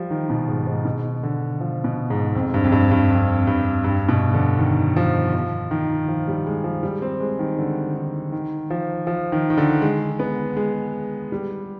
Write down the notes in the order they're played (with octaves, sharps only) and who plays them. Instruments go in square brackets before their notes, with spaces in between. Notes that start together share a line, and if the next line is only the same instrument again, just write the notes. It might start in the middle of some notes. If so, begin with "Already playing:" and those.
Already playing: [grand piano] F3 G3
D#3
B2
G#2
G#2
B2
D3
F3
B2
G#2
F2
G2
F2
G2
G2
F2
G2
G2
B2
D3
D#3
F3
F3
D#3
F3
G3
G#3
F3
G3
C4
G#3
D#3
D3
D#3
D#3
F3
F3
D#3
D#3
D3
G#3
B3
G#3
G3